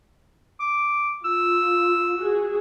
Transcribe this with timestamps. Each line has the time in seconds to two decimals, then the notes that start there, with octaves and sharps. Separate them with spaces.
0.60 D6
1.25 F4 E6
2.19 F#4 G#4